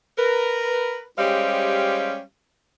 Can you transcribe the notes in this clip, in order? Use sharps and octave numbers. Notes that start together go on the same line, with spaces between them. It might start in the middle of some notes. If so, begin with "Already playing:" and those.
A#4 B4
G3 G#3 C#4 G4 C5 F5